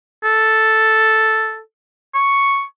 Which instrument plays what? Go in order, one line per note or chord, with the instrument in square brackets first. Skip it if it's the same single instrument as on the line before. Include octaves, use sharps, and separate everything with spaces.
[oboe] A4
C#6